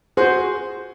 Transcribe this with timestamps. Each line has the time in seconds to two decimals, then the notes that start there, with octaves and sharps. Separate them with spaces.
0.17 F#4 G#4 C5